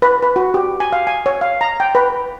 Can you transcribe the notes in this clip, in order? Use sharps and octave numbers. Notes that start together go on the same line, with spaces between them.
B4
B4
F#4
G4
G#5
F5
G#5
C#5
F5
A#5
G5
B4